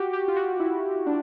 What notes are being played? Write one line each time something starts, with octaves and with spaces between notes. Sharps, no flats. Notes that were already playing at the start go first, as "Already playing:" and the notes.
Already playing: F#4 G4
G4
F4
F#4
E4
D4